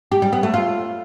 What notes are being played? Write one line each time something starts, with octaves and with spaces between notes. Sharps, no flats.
G4
G3
B3
A3
F4